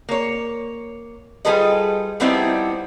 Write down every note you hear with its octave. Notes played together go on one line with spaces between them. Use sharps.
A#3 C#5
G3 F4 G#4 A4 B4 D#5
F3 G3 B3 C4 D#4 E4